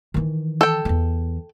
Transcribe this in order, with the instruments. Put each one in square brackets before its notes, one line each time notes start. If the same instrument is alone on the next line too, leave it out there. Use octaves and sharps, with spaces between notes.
[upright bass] D#3 E3
[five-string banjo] A4 G5
[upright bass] E2 E3